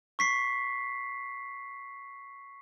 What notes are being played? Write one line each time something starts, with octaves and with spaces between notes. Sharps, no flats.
C#6 B6 C7